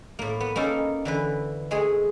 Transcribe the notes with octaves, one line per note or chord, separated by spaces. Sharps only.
A2 A#3
B3
A#3 C#4 D#4 A4
D3 E3 B4
G#3 A3 G#4